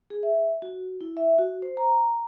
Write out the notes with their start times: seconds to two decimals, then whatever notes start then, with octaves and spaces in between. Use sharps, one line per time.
0.10 G#4
0.23 E5
0.62 F#4
1.01 E4
1.17 E5
1.39 F#4
1.62 C5
1.77 A#5